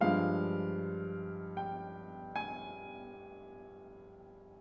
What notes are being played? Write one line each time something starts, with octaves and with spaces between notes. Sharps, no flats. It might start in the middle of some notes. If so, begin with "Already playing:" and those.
G2 F3 G#3 F5
G5
G#5